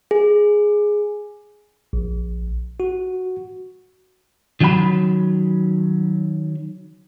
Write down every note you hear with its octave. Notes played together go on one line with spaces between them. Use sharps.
G#4
A#1
F#4
D#3 F#3 C#4 F#5 B5